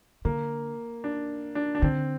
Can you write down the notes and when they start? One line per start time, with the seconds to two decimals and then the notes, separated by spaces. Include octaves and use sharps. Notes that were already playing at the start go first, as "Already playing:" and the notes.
0.25 D3 A#3
1.04 D4
1.55 D4
1.75 D4
1.82 D3 C4